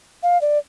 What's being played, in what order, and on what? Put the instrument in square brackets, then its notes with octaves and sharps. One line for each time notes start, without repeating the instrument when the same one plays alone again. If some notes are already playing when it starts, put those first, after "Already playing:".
[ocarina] F5
D5